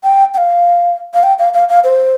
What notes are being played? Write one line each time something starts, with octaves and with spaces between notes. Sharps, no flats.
G5
G5
F5
F5
G5
F5
F5
F5
C5